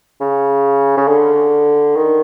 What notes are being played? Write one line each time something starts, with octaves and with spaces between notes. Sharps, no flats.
C#3
C#3
D3
D#3